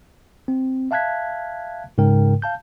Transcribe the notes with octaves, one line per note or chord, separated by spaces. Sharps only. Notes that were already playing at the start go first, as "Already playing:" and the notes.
C4
E5 F5 A5 F#6 G#6 B6
G#2 C#3 G#3 A#4 G5
F5 A5 G6